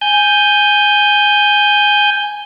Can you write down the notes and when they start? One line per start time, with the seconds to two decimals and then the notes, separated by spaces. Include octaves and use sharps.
0.01 G#5 G6